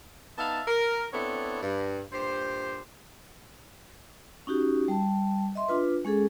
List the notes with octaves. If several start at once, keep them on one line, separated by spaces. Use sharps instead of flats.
B3 D#4 E5 F5 A5
A#4
B3 C4 D4 E4 A4 C#5
G2
G2 A#2 G4 C5
C#4 D#4 F#4 G4
G3 A5
D#5 E5 C6
D4 F4 B4
G#3 C#4 G#4 A4